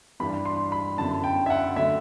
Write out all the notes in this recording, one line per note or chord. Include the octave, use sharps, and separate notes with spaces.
G2 E3 G3 D4 G4 B5
C6
B5
F#2 D3 F#3 B3 E4 A5
G5
E5
F#5
D3 F#3 A3 E5